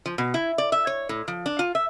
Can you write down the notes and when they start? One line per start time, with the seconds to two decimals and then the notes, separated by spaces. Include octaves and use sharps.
0.06 F3
0.18 B2
0.34 E4
0.58 D5
0.72 E5
0.87 C#5
1.09 A2
1.28 F3
1.46 D4
1.59 F4
1.75 E5